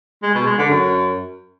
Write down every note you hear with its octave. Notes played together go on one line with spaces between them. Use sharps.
G#3
B2
G#3
D3
F#2